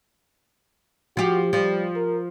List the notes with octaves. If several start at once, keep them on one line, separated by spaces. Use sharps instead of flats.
F3 F#4 G4
F3 G3
A#4